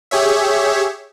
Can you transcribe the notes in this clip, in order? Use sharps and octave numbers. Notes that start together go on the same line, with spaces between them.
G4 G#4 C#5 E5